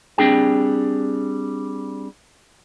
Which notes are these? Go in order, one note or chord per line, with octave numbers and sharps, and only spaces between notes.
G3 C4 D4 G#4 G5